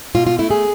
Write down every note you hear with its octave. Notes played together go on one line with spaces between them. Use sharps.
B2 F4
F4
A3 E4
G#4